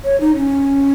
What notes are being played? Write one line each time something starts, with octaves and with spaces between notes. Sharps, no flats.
C#5
D#4
C#4